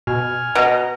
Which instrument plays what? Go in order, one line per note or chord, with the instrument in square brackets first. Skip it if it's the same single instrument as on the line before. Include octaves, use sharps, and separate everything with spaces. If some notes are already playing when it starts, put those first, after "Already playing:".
[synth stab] B2 [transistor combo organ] G#5 F6
[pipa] B2 [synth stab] D#5 A#5